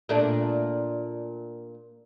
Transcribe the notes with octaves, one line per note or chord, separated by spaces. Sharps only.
A#2 A3 D4